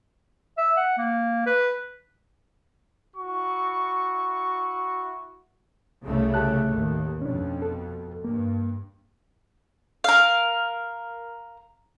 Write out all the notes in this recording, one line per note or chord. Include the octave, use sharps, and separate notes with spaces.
E5
F#5
A#3
B4
E4 F#4 C#6
C2 C#3 A3
G4 A5 F#6
A1 D#2
F2 B2 C#4 D4
A4
G2 A#3
A#4 F5